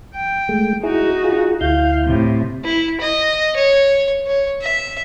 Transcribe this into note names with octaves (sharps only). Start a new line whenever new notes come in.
G5
G#3 A3
D#4 E4 F#4 G#4
F4 G#4
D2 E4 F5 G6
A2 C3
E4
D#5
C#5
C#5
E5